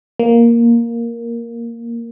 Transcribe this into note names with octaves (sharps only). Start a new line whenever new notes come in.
A#3